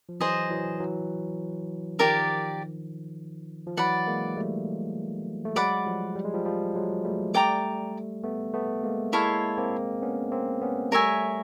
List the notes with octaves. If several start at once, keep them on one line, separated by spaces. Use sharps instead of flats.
F3
E3 F#3 G#4 C5 D#5
E3 F#3
E3 F#3
D#3 F3 G4 A#4 D5 F5
F3
E3 F#3 D5 F#5 B5
G#3 A#3
G3 A3
A3
F#3 G#3 D5 F#5 B5 D6
F3 G3
G3
G#3
F3 G3
F3 G3
F#3 G#3
G3 A3
G3 A3 D5 G5 A#5 D6
A3 B3
A3 B3
G#3 A#3
G#3 A#3 E4 A4 C#5 F5
A#3 C4
B3 C#4
A#3 C4
B3 C#4
G3 A3 A#4 C#5 E5 G#5